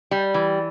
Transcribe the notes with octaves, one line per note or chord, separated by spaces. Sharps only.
G3
E3